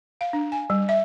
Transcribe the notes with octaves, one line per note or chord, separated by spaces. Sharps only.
F5
D4
G#5
G3
E5